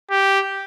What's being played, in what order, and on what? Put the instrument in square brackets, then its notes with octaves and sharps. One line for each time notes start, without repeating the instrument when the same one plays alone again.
[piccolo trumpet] G4